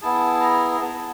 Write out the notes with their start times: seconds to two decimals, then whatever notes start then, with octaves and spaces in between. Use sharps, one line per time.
0.02 B3 E4 G#4 A5
0.41 A#5
0.72 A#5
0.81 B3 E4 G#4 A5